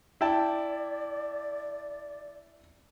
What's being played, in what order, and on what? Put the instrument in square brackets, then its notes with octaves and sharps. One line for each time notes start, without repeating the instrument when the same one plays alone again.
[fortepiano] E4 G5 A5 [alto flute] D5